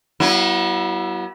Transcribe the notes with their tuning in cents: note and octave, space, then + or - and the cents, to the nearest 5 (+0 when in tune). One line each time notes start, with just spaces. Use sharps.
F#3 +35 B3 -30 E4 +10